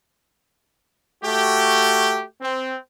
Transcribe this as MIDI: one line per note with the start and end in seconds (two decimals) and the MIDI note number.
1.22 2.23 57
1.22 2.23 66
1.22 2.23 67
2.41 2.75 60